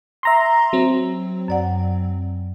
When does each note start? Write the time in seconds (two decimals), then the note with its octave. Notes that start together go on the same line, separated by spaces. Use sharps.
0.23 E5 A#5 C6
0.73 F#3 C4
1.48 F#2 D5 F#5